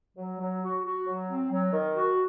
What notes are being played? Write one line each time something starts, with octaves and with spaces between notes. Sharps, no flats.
F#3
F#3
F#4
F#4
F#3
C4
F#3
D#3
F#4